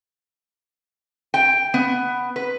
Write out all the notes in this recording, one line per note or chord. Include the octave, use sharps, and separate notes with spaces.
G5
B3
B4